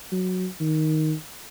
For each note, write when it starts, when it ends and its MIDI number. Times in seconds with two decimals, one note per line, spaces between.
0.12 0.47 54
0.60 1.14 51